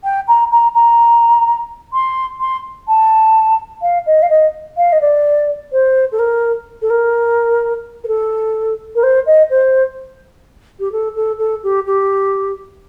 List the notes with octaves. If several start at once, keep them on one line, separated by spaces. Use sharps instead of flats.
G5
A#5
A#5
A#5
C6
C6
A5
F5
D#5
F5
D#5
F5
D#5
D5
C5
A4
A#4
A4
A#4
A#4
A4
A#4
C5
D#5
C5
G4
A4
A4
A4
G4
G4